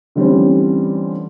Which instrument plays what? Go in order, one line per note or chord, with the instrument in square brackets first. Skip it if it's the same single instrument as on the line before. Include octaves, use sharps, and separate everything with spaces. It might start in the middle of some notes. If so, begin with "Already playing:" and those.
[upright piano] D3 E3 G3 A3 C4 C#4